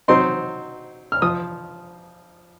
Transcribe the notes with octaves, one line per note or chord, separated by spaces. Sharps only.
F#3 C4 D#4 C6
F6
F3 D#6